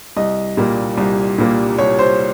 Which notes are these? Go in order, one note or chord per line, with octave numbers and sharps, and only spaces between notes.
C2 D#5
A#2 G3 A#3
C2
A#2 G3 A#3
C2 C#5
C5